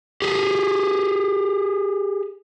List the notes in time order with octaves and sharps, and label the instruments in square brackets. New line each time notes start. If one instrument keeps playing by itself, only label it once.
[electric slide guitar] G4 G#4